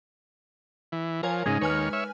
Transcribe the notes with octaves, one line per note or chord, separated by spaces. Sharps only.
E3
F3 A#4 C#5 G#5
G#2 C#3 G#3 D#4
D#2 B4 C#5 G#5 F6
C#5 E5